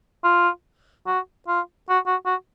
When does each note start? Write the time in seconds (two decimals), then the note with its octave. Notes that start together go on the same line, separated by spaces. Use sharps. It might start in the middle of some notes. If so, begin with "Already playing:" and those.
0.24 F4
1.07 F#4
1.48 F4
1.89 F#4
2.07 F#4
2.26 F#4